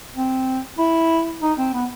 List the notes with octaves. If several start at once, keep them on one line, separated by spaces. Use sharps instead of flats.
C4
E4
D#4
C4
B3